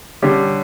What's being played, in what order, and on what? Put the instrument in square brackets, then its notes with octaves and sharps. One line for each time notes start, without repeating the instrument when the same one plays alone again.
[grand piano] D3 G3 C#4 G4